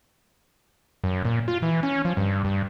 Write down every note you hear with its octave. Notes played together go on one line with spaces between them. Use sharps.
F#2
A#2
F4
E3
C#4
F3
G2
G2